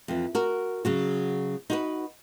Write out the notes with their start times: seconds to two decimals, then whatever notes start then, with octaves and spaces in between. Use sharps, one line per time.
0.08 F2 E3
0.35 F#4 A#4
0.85 C#3 F#3 F#4
1.70 D#4 F#4 B4